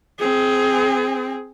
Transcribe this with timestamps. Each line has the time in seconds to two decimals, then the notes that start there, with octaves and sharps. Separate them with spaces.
0.19 C4 G#4